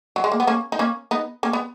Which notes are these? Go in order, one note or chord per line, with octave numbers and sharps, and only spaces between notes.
F#3
G#3
A#3
B3
A#3 C#4
D#4
A#3 C#4
B3 D#4
A#3 C#4
B3